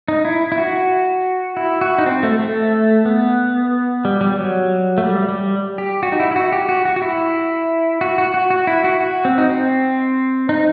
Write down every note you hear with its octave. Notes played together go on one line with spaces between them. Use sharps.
D#4
E4
E4
F#4
E4
F#4
D#4
C4
A3
A3
B3
G3
G3
F#3
A3
G3
G3
G4
F#4
D#4
E4
E4
F#4
G4
F#4
F#4
F#4
E4
F#4
F#4
F#4
F#4
E4
F#4
F#4
C4
D#4
C4
D#4